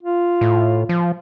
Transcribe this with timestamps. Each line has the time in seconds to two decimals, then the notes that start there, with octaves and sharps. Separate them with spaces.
0.03 F4
0.41 A2
0.89 F3